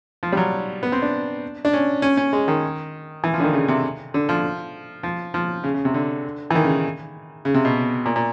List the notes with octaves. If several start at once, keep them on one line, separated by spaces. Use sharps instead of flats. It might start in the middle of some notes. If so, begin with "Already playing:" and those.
F3
G3
F#3
B3
C4
D4
D4
C#4
C#4
C#4
G#3
D#3
E3
F3
D3
D#3
C#3
C3
D3
F3
F3
F3
C#3
C#3
C3
D3
E3
D#3
C#3
C#3
C3
B2
A#2
A#2